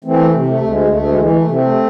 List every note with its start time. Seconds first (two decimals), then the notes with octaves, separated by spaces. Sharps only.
0.04 E3 A3 C4
0.32 C3
0.46 A3
0.61 D2
0.67 G#3
0.88 D2 A3
1.09 G#3
1.16 E3
1.25 G#3
1.30 A3
1.44 C3
1.50 A3 C4